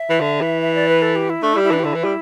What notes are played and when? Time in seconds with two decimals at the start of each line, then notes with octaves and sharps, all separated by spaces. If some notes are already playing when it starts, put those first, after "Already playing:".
Already playing: E5
0.10 E3
0.20 D3
0.41 E3
0.62 E5
0.75 D5
0.88 B4
1.02 A4
1.16 G4
1.30 E4
1.42 A3 D4
1.53 E4
1.56 G3
1.64 E4
1.71 E3 D4
1.79 G4
1.84 D3 E4
1.94 E3
2.04 G3